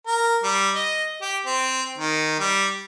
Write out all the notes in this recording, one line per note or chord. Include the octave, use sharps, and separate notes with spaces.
A#4
G3
D#5
G4
C4
D#3
G3